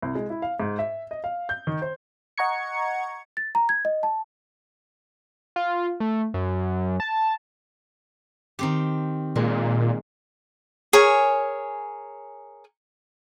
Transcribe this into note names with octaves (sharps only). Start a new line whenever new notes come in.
C2
G#3
E4
F5
G#2
E5
D#5
F5
G6
D#3
C5
D#5 F#5 A#5 C#6 G#6 C#7
A6
A#5
G#6
D#5
A5
F4
A3
F#2
A5
D#3 C4 G4
A#2 G#3
G#4 A#4 C#5